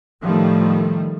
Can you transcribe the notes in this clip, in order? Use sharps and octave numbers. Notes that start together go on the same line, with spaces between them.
A2 D#3 F3 G3 A3